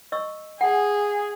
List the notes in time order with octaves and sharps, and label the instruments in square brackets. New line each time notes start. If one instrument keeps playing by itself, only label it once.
[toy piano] D#5 C#6 E6
[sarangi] G#4 [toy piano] F#5 G#5